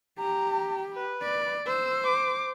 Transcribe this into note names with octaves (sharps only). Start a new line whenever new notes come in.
G4 A#5
B4
D5
C5 E6
D6